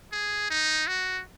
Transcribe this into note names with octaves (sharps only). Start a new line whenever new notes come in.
G#4
D#4
F#4